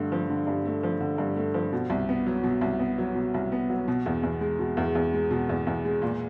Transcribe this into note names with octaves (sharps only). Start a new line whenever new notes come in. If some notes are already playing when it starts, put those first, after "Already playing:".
Already playing: G2 D3 A3
F3
D3
G2
A3
F3
D3
G2
A3
F3
B2
C2
B3
F#3
B2
C2
B3
F#3
B2
C2
B3
F#3
B2
E2
E2
G#3
B2
E2
E2
G#3
B2
E2
E2
G#3
A#2